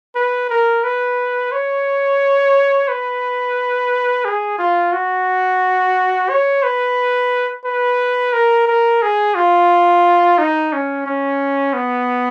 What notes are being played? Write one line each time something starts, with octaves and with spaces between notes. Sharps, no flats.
B4
A#4
B4
C#5
B4
G#4
F4
F#4
C#5
B4
B4
A#4
A#4
G#4
F4
D#4
C#4
C#4
B3